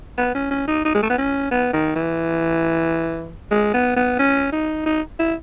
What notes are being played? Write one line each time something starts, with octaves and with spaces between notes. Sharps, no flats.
B3
C#4
C#4
D#4
D#4
G#3
A3
B3
C#4
B3
D#3
E3
G#3
B3
B3
C#4
D#4
D#4
E4